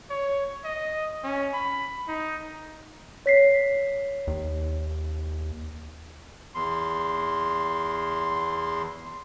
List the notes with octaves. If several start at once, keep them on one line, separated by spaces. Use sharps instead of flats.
C#5
D#5
C#4
B5
D#4
C#5 B6 C7
D#2
E2 C6